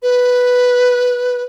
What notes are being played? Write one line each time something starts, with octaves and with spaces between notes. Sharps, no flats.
B4